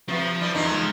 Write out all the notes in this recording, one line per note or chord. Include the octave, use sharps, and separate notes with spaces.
C3 F3 B3
G3 E4
E2 D#3 F3 D#4
G#3 F4